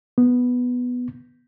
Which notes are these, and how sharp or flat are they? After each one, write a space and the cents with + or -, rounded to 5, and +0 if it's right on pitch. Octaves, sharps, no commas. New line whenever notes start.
B3 +0